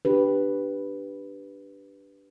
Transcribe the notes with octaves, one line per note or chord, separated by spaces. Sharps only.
D4 G4 B4